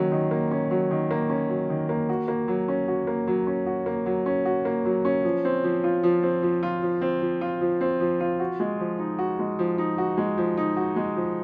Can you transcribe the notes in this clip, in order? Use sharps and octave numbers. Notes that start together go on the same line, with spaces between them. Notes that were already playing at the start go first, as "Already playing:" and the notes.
Already playing: D#3 F#3 A#3 C#4
D#3
A#3
C#4
F#3
D#3
A#3
C#4
F#3
D#3
A#3
F#4
A#3
F#3
C#4
F#4
A#3
F#3
C#4
F#4
A#3
F#3
C#4
F#4
A#3
F#3
C#4
F3
C4
F3
F4
F3
C4
F3
F4
F3
C4
F3
F4
F3
C4
F3
F4
F#4
G#3
F3
D#4
F#4
G#3
F3
D#4
F#4
G#3
F3
D#4
F#4
G#3
F3